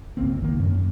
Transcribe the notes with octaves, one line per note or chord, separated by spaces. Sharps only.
G1 C#2 A#3 C4
D#3 A#3
F#2